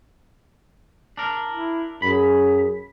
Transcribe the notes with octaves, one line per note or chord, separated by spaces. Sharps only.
D4 A#4
E4
F#2 G#4 B5